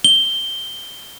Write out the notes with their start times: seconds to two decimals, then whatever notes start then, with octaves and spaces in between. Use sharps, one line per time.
0.04 G7